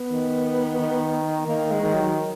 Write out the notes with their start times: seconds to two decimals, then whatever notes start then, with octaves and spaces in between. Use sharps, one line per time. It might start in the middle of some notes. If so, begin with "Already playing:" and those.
Already playing: B3
0.11 D#3
0.80 D#3
1.48 D#3 A#3
1.71 G#3
1.82 D#3
1.94 F#3